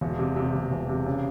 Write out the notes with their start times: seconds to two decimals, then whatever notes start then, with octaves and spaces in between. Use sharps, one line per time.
0.01 E1
0.19 C3
0.36 C3
0.54 E1
0.71 E1
0.89 C3
1.06 C#3